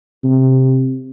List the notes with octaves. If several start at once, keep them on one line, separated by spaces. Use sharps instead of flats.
C3